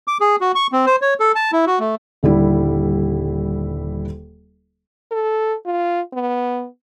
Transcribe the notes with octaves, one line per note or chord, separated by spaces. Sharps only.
D6
G#4
F#4
C#6
C4
C5
C#5
A4
A5
E4
F#4
A3
D#1 D3 G3 E4
A4
F4
B3